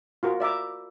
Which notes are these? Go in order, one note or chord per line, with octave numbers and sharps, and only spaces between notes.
F4 F#4 A#4
D5 E5 A#5 D6